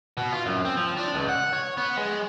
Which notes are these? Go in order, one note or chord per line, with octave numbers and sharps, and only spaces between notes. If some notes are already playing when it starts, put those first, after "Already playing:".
B2
F4
F#2
C4
F3
D4
C#2
F#5
C#5
B3
G#3